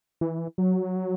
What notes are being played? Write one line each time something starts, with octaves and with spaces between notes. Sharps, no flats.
E3
F#3